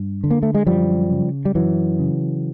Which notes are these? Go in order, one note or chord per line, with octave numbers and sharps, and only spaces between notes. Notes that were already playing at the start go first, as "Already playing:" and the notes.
Already playing: G2
D3
A#3
A3
G#3
F#2 F3 G3
C#3
G3
F#2 E3 F#3
C#3